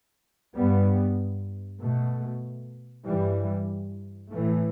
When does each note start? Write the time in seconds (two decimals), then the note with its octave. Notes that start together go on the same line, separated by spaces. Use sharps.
0.56 G2 G3 B3
1.81 B2 A3
3.05 G2 E3 G3
4.30 A2 E3 A3